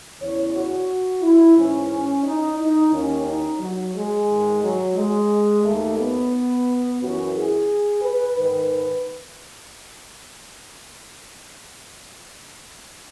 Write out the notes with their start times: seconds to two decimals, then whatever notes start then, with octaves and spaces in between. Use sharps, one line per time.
0.20 E2 C#3 E3 C#5
0.54 F#4
1.22 E4
1.56 G#2 E3 C#4
2.25 D#4
2.59 D#4
2.92 D#2 D#3 C#4
3.26 D#4
3.60 F#3
3.94 G#3
4.28 G#2 D#3
4.62 F#3
4.96 G#3
5.64 D#2 D#3 A3
5.98 B3
7.01 F#2 E3 F#4
7.35 G#4
8.03 B4
8.37 G#2 D#3 B4